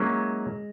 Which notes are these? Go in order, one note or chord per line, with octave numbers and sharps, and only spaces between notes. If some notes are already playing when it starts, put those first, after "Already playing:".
Already playing: F#3 G#3 A#3 C#4 E4